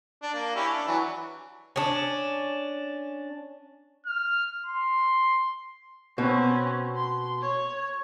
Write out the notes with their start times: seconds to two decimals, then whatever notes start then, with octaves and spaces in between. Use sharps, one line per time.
0.23 D4
0.34 A#3
0.56 C#4 E4 G4
0.68 D4
0.87 E3 F#3
1.76 C#4 D4
4.06 F6
4.66 C6
6.18 B2 C4 C#4
6.96 C6
7.41 C#5